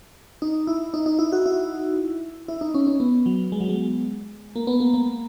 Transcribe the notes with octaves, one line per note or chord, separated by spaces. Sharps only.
D#4
E4
D#4
D#4
E4
F#4
E4
E4
D#4
C#4
C#4
B3
F#3
G#3
F#3
G#3
A#3
B3
A#3
A#3